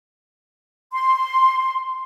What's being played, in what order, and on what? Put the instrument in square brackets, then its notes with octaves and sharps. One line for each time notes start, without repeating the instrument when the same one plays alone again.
[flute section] C6